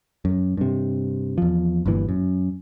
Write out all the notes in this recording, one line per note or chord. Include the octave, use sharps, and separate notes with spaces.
F#2
G2 C3
E2 F3
G1 G2 A#2 E3
F#2